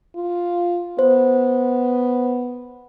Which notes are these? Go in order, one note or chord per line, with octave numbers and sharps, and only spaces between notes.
F4
B3 C5